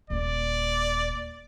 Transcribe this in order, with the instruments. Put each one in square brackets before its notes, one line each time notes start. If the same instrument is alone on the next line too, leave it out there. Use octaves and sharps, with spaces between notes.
[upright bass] D#1 A#3 [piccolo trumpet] D5